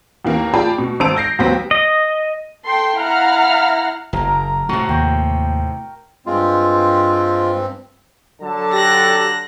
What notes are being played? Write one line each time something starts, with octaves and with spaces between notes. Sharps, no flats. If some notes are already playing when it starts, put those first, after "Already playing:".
D#2 E3 A#3
F4 G#4 D5 G5 A5 B5
B2
G#1 C5 A5 E6 D7 F7
G6 A#6 C7
D#2 F#3 B3 C5 G5 B6
D#5
A4 G5 C6
E4 F5 F#5 A#5 F6
F#1 A#4 A5 A#5
A2 C3 A3 F#4 F#5
D#2 G5 C#6
G2 G#3 C4 F4
D3 F#3 A4 A5
G4 F#6 A#6